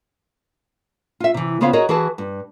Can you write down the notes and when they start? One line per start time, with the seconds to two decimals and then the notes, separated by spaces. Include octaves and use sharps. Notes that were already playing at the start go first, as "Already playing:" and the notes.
1.20 F4 E5
1.34 C3 E3
1.61 C#3 B3 F4 C5 C#5 F5
1.73 F#4 G#4 A#4 C#5 D#5
1.89 E3 F#4 G#4 B4 A5
2.18 G2